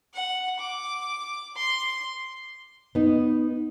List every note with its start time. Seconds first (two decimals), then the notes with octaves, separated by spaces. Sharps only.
0.13 F#5
0.60 D6
1.56 C6
2.95 B3 D#4